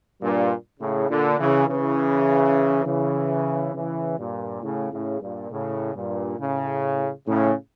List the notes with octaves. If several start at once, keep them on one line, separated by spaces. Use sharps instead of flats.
G2 A#2
A2 C#3
A#2 D3
C#3 E3
C#3 E3
C#3 E3
C#3 E3
G2 A#2
A2 C#3
A2 C#3
G2 A#2
A2 C#3
G2 A#2
A2 C#3
A2 C#3